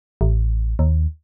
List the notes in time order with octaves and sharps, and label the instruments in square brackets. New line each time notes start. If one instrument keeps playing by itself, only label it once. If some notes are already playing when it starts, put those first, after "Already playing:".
[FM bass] A1
D#2